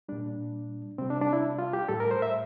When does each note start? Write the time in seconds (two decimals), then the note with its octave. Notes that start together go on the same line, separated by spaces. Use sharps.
0.09 A#2 G3 D4
0.98 C3 G3 C4
1.10 D4
1.21 D4
1.33 E4
1.59 F4
1.73 G4
1.88 A2 G3 A4
2.00 A#4
2.11 C5
2.22 E5